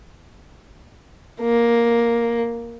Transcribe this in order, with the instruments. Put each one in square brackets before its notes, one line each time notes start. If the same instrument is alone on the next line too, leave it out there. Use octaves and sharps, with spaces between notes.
[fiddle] A#3